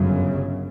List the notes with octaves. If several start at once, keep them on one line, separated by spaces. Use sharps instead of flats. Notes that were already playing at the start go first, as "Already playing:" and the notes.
Already playing: G1 F#2 C#3